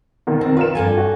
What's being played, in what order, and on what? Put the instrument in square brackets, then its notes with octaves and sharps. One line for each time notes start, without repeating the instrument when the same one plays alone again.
[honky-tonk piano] B2 D#3
[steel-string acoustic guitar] C4
[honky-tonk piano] F4 A#4 E7 [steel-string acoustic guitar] B4
[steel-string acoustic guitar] G2 A4 G#5
[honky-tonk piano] F#4